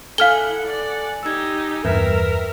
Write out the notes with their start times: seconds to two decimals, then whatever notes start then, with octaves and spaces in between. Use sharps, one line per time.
0.18 E4 A4 F5 F#5 G#5 F6 G7
0.66 D5 F#5
1.23 D#4 G4 E6 G#6
1.85 E2 G2 A#4 B4 E5